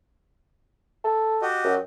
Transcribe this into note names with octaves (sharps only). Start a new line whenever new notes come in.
A4
F#4 G4 D#5
F#2